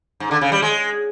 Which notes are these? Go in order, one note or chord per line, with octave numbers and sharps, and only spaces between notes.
G#2
D3
C#3
G3
G#3